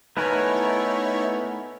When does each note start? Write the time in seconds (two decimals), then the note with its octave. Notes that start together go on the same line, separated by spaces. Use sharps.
0.17 A3 B3 D#4 E4 A#4 B4 C#5 G#5